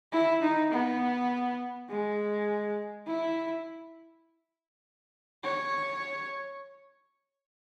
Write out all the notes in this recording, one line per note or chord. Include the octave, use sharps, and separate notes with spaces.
E4
D#4
B3
G#3
E4
C#5